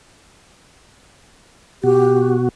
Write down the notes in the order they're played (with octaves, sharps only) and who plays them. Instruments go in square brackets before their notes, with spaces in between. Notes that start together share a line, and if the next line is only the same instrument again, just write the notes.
[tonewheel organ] B2 F#4 [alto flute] G4